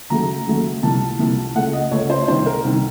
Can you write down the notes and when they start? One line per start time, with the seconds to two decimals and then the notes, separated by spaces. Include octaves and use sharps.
0.10 D#2 C#3 F#3 A3 A#5
0.47 D#2 C#3 F#3 A3
0.83 C2 C3 F3 A#3 A5
1.19 C2 C3 F3 A#3
1.55 C#2 C#3 A3 F#5
1.73 D#5
1.91 C#2 C#3 A3 C#5
2.10 C5
2.28 C2 C3 D#3 C5
2.46 A#4
2.64 C2 C3 D#3